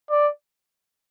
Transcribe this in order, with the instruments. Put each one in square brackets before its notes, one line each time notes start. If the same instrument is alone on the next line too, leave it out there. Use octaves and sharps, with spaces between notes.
[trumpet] D5